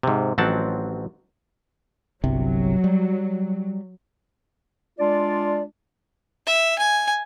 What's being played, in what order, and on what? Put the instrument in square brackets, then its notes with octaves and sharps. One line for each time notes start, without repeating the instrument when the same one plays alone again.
[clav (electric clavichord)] G#2 C3
A1 F3 F#3 C4 F#5 A5
[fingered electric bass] G1 C2 C3 [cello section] F#3
[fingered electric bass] G3
[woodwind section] G#3 D4 F4 D5
[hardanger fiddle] E5
G#5